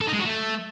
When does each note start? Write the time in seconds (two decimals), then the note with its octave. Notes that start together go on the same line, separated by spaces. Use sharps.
0.01 A4
0.07 D#4
0.13 G#3
0.19 F#4
0.25 A3